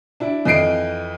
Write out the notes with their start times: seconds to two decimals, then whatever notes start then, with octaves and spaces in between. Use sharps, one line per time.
0.20 D4 E4
0.45 F2 E3 D#5 C7 D7